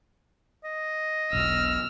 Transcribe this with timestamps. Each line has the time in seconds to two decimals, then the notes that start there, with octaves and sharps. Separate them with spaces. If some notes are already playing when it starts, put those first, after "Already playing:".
0.64 D#5
1.33 E1 B1 B2 E6 F6